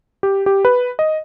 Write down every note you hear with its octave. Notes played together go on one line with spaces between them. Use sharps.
G4
G4
B4
D#5